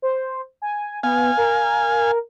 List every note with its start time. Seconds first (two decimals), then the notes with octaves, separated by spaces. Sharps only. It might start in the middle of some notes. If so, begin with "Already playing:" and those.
0.02 C5
0.62 G#5
1.03 B3 F5 G#5
1.37 A#4